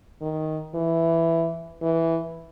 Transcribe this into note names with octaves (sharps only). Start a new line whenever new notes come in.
D#3
E3
E3